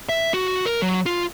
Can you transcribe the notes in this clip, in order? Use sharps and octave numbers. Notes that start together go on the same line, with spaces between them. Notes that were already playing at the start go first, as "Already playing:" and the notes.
E5
F#4
A#4
F#3
F4